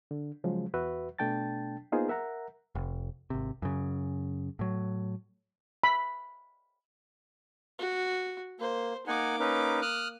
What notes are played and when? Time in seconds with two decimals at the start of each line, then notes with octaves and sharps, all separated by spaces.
0.11 D3
0.44 C#3 F3 F#3 G#3
0.74 E2 F#4 B4 E5
1.19 B2 A3 D4 G5 A5 A6
1.92 A#3 B3 D#4 F4 G#4 C5
2.08 A#4 E5 F#5 A#5
2.75 F1
3.30 G#1 C3
3.62 F#2 C#3
4.59 A2 F#3
5.84 B5
7.79 F#4
8.60 A#3 C5
9.07 A#3 D#4 F#5 G#5 D6
9.40 C#4 D#4 B4
9.82 D#6 F6 F#6